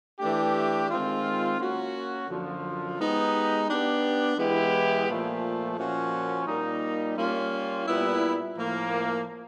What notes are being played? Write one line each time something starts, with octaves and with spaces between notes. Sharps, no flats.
E3 A3 D4 G4
D#3 G#3 C4 F4
A#3 C#4 F#4 A#4
F#2 D3 F3
G#3 B3 D#4 G4
B3 D4 G4
E3 G#3 B3 E4 G4
A#2 F3 A3
A#2 F3 A#3 C#4 F#4
A#2 G3 A#3 D#4
G3 A#3 C#4 F4
A#2 G3 B3 E4
A2 F3 A#3